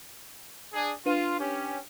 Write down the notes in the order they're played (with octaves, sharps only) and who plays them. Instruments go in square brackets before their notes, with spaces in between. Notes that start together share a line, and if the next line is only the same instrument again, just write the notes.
[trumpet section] D4 G#4
[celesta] D4 B4 D#7 [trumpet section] F4
[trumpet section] C#4 G4